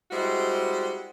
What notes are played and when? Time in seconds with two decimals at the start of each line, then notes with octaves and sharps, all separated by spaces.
0.11 G3 G#3 C4 E4 F#4